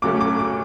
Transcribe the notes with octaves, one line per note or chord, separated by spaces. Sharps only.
D2 C#3 F#3 A3 C#4 D6
D6
D6